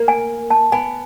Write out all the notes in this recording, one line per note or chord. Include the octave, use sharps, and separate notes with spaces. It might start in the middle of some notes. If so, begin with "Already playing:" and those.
Already playing: A#3
G#5
A5
B3 G#5